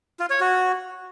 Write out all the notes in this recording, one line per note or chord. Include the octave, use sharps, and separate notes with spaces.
F4
C#5
F#4